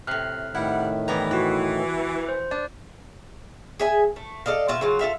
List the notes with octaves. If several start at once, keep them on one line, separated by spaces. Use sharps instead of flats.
A2 C3 F6 F#6 C7
A2 D#3 G3 E4 B4 F#5
E3 G3 B3 A#5
E4 F#4 B4
C5
D4 D5
G#4 E5 G#5
A3
A4 D5 D#5 F5
B2 F4 E5
C#3 F#3 F4
F4 A4 E5 F5